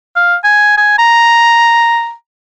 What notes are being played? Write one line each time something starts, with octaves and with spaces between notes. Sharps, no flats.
F5
G#5
G#5
A#5